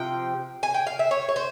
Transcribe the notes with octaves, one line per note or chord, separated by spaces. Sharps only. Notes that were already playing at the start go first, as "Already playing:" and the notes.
Already playing: C3 F3 G5
G#5
G5
F5
E5
C#5
C#5
C5